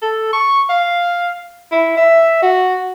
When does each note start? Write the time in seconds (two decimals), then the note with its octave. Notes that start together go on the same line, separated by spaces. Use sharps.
0.02 A4
0.33 C#6
0.69 F5
1.71 E4
1.97 E5
2.42 F#4